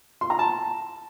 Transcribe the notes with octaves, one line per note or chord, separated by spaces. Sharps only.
C6
A#5
A5